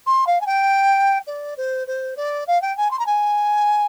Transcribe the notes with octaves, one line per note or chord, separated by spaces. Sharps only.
C6
F5
G#5
G5
D5
C5
C5
D5
F5
G5
G#5
C6
A#5
G#5